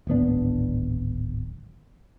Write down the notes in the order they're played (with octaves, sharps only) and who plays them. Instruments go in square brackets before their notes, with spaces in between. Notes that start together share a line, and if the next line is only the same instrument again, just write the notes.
[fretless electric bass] D1 G#1 B3 D4